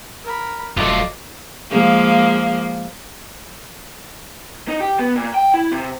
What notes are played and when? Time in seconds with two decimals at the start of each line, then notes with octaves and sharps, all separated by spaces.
0.24 A#4 B5
0.77 E1 G2 F#3 A3 F4 D5 D#5
1.70 F3 G#3 A#3
4.68 D#4
4.80 G4
4.99 B3
5.16 A#2
5.34 G5
5.54 E4
5.72 C3